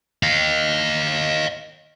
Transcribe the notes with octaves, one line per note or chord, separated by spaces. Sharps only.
D#5 F5